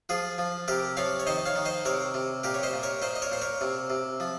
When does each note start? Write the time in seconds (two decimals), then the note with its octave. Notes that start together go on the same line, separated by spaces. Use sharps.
0.09 F3 F4 G#4
0.38 F3
0.68 C3 G4 A#4
0.97 F3 C#5 F5
1.20 C#5
1.27 D#3 C5 D#5
1.46 C#5 F5
1.55 D#3
1.65 C5 D#5
1.85 C3 A#4 C#5
2.14 C3
2.44 A#2 G4 A#4
2.54 C#5
2.63 C5 D#5
2.73 A#2
2.83 A#4 C#5
3.02 A#2 C5 D#5
3.16 D#5
3.22 A#4 C#5
3.32 A#2 C5
3.42 A#4 C#5
3.61 C3
3.90 C3
4.20 F3